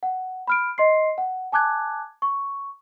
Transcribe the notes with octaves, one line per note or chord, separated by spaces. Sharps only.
F#5
B5 F6 D7
D#5 C6 C7
F#5
G#5 A5 D6 F#6 G#6
C#6